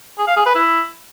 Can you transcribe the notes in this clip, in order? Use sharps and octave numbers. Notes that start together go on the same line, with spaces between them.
G#4
F5
G#4
B4
E4